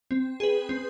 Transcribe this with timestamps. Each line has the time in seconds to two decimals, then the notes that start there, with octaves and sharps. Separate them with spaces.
0.11 C4
0.40 G#4 B4
0.69 C4